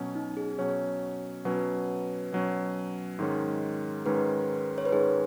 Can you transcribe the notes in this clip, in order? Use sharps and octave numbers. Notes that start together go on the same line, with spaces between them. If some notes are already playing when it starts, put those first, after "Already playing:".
Already playing: B2 F#3 C#4
D#4
G#4
B2 F#3 C#4 C#5
B2 F#3 C#4 B4
B2 F#3 C#4
G#2 D#3 G#3 C#4
G#2 D#3 G#3 C#4 B4
C#5
B4
G#2 D#3 G#3 C#4 G#4